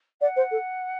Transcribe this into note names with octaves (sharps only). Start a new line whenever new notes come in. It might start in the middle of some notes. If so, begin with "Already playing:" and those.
D5 F#5
C5
A4